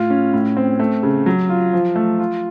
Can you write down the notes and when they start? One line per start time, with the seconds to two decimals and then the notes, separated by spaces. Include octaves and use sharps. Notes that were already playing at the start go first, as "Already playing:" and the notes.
Already playing: A2 F4
0.10 C#4
0.34 A2
0.57 C4
0.79 A3
1.03 C#3
1.26 F#3
1.49 F4
1.73 F3
1.95 A3
2.19 F4